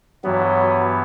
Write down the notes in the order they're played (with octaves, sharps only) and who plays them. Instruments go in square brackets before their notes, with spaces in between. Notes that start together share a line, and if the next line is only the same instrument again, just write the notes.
[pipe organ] G2 E3 B3 [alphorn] F#3